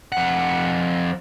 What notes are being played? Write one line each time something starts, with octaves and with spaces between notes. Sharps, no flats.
F2 F#5